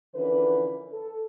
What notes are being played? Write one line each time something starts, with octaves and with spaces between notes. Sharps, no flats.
D3 E3 F3 C#4 A#4 B4
A4